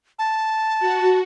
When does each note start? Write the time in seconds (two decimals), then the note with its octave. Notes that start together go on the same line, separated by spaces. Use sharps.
0.19 A5
0.79 F#4